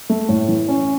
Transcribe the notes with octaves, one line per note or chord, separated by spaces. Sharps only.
A3
A2
E3
C#4